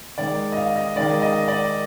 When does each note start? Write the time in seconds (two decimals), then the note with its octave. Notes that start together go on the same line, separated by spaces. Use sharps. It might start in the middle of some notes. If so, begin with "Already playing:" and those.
0.18 D#3 G#3 D5
0.52 D#5
0.57 F5
0.76 D#5
0.96 D#3 G#3 D5
1.22 D#5
1.48 D5